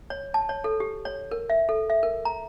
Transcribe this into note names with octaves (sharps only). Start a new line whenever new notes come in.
C#5
A5
C#5
A4
G4
C#5
A#4
E5
A4
E5
A#4
A#5